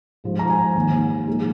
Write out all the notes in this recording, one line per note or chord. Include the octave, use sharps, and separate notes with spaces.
G#2 F3 G#3
A#5
G#5
D#2 D#3 A#3
A#2 F3 G#3